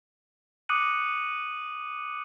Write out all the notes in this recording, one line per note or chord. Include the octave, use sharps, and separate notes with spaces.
D6 D#6 F#6 C#7 D#7 F#7